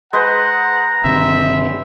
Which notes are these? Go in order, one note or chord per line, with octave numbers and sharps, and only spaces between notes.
G#3 B4 C5 F#5 A#5
G1 C3 D#3 E5